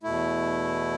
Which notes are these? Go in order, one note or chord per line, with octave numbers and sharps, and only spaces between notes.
E2 B2 A3 E4